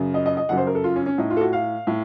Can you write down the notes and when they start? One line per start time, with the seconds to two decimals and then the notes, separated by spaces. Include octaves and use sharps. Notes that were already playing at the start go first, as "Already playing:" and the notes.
Already playing: F#2 C#3
0.14 D#5
0.26 D#5
0.37 D#5
0.49 F#2 C#3 F#5
0.57 C5
0.67 A#4
0.75 A4
0.84 F4
0.96 C#4
1.06 C#4
1.18 A2 D#4
1.30 F4
1.37 A4
1.41 F#4
1.53 F5
1.87 A2